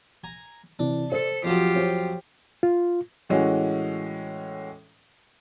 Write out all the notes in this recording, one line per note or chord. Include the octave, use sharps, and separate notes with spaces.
G#5 A#5
C3 E3 D4
A4 C5
F2 F3 F#3 F4 G4
C5 C#5 G5
F4
A2 E3 G#3 C#4 F#4